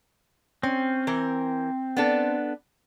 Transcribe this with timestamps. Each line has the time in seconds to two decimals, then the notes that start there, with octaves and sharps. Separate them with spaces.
0.63 C4 C#4
1.07 E3 A#4
1.97 B3 D4 A4